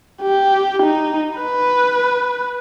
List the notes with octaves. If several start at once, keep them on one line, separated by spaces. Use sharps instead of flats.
G4
D#4
B4